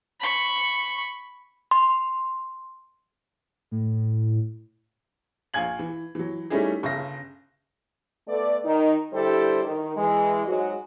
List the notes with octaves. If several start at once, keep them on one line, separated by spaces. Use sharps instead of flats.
B5 C#6
C6
A2
A#1 F5 G#5 G#6 F#7
E3
E3 F#3
G3 A3 C#4 D#4 E4 G#4
G1 C#3 E5 A#6
A3 B3 A4 D5
D#3 D#4
D3 G3 E4 G4 A4 C5
D#3
E3 G#3
G#2 F#3 G#3 F#4